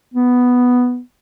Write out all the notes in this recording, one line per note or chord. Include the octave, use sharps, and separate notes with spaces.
B3